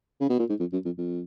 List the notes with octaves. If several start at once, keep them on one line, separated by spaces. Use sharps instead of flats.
C#3
B2
A#2
G#2
F2
F#2
F2
F2